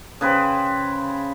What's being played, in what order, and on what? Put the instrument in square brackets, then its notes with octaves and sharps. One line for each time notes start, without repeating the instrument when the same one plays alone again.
[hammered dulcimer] C#3 B4 C5 G5